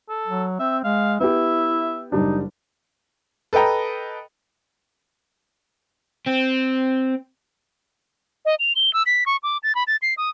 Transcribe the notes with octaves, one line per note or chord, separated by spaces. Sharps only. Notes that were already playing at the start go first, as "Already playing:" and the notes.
A4
F#3
C4 E5
G#3 F5
B3 E4 G4 E5
F#1 G3 D4 D#4
A4 B4 D#5 G5 A#5
C4
D#5
F7
G7
E6
B6
C#6
D6
A6
B5
A6
C7
D#6